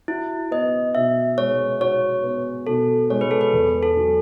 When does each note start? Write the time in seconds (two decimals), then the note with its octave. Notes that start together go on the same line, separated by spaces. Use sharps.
0.08 E4 F#4
0.51 B3 D#5
0.95 B2 E5
1.38 G#3 C#5
1.81 F#4 C#5
2.23 B3
2.67 B2 A4
3.10 G#3 C#5
3.21 B4
3.31 A4
3.41 B4
3.53 E2
3.83 A4
3.97 F#3